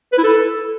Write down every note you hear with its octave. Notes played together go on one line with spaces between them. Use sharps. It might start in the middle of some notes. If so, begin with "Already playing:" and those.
B4
E4
A4